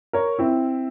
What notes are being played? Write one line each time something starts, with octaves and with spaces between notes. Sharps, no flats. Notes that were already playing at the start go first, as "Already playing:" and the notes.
A#4 C#5
C4 E4